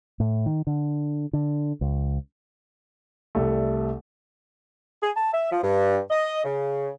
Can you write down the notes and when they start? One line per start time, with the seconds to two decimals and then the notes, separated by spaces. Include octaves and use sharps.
0.20 A2
0.46 D#3
0.67 D3
1.33 D3
1.81 C#2
3.35 C2 G3 A3
5.02 G#4
5.16 A5
5.33 E5
5.51 F3
5.63 G2
6.10 D#5
6.44 C#3